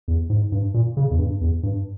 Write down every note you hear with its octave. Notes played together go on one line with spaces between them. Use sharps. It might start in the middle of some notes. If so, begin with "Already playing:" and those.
E2
G#2
G2
A#2
C#3
E2
G2
E2
G2